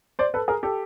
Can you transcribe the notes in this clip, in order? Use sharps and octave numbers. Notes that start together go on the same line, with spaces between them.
C5 D5
A4 B4
G#4 A#4
G4 A4